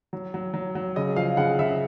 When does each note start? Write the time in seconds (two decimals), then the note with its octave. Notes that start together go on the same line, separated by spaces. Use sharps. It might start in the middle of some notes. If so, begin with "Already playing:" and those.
0.13 F#3
0.34 F#3
0.54 F#3
0.75 F#3
0.96 C#3 D#5
1.16 F3 F5
1.37 C#3 F#5
1.59 C#3 E5